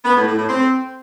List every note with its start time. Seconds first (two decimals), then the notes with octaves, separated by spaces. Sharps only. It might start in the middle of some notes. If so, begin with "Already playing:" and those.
0.05 B3
0.16 A2
0.27 A2
0.37 A2
0.48 C4